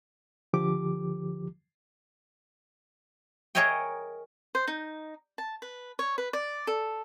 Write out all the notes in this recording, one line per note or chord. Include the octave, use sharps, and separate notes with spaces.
C#2 D3 F3 G4 D6
G#4 A#4 C#5 D#5 E5 G5
C5
D#4
A5
B4
C#5
B4
D5
A4